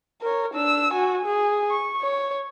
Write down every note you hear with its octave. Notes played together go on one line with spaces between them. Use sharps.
A#4 C#5
D4 E6
F#4 G#5
G#4
C#6
C#5